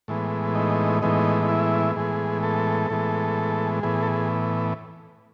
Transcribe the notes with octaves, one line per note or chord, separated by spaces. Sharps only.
A2 E3 G#3 B3
D#4
A2 E3 G#3 B3 D#4
D#4
E4
A2 E3 G#3 B3 G#4
A4
A2 E3 G#3 B3
A2 E3 B3 G#4
A4
G#4